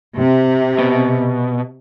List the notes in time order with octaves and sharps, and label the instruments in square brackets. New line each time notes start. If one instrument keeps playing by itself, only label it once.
[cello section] C3
[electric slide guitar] B2